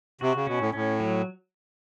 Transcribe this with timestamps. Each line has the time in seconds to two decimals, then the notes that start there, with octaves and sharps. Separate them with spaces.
0.21 C3 F#4
0.35 C#3
0.47 B2 C#4
0.60 A2
0.73 A2 C#4
1.00 F#3